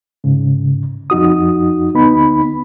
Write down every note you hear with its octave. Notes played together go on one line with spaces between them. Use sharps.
G#2 C#3
F2 D#4 F#4 D#6
D2 B3 D#4 B5